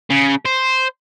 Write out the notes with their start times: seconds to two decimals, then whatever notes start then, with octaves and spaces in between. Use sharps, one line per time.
0.10 C#3
0.46 C5